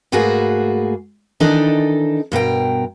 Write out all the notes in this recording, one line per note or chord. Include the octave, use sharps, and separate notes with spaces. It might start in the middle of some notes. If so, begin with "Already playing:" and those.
G#2 A3 A#3 F#4 G#4 B4
D#3 E3 D4 D#4 A4 D#5
G2 B2 A#4 G5